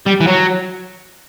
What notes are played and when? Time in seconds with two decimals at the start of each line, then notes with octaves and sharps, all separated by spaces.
0.06 G3
0.20 E3
0.27 F#3